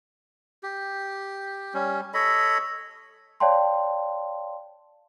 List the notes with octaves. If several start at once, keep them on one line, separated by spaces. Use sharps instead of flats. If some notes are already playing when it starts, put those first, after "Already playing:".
G4
G3 C#4
A4 C#5 D#5 B5
C#5 D5 F5 G5 A5 C6